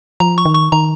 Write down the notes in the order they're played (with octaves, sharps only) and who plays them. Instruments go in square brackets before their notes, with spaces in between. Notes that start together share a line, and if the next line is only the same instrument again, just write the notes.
[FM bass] F3 [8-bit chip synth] A#5
[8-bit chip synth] C#6
[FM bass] D#3
[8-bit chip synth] C#6
[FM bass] D#3 [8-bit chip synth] A#5